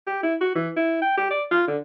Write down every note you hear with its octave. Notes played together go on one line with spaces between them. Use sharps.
G4
E4
F#4
E3
E4
G5
G4
D5
F4
D3